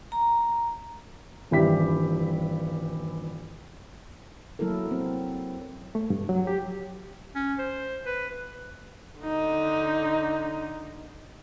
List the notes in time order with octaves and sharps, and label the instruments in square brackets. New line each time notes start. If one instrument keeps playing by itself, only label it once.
[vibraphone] A#5
[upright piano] D#1 G2 E3 E4 G4 B6
[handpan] F#3 A#3 E4 A4 A#4
C4
[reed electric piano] A3
G2
F#3
G4
[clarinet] C#4
C5
B4
[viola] D3 D#4